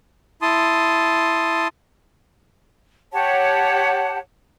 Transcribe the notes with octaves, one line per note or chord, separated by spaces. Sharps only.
E4 A5 C6 D#6
G4 C#5 F#5 A5